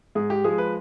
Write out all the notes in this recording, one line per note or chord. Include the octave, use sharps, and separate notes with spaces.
G#2 G#4
G4
F3 G#3 G#4
B4